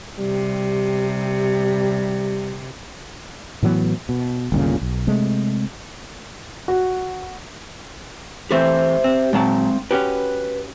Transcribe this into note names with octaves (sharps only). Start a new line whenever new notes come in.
C3 G3
A2 E3 F#3 B3
B2
G1 D#2 A#2 C#3
B1
C3 G#3 A3
F#4
E3 A3 C4 G4 C5 E5
C4
A#2 F#3 G#3 C4 A5
C#4 F#4 G4 B4